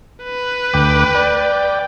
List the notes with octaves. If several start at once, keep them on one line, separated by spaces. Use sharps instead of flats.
B4
D2 G5 D6
D5 G5